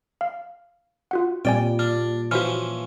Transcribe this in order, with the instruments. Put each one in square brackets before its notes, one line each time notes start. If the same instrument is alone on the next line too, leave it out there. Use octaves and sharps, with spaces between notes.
[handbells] F5
F4 F#4 F#5
[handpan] A#2 G3 [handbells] C4 D5 G#5 [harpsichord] G5
[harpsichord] D4 [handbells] F6
[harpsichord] E3 F3 C#4 [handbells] F#4 F6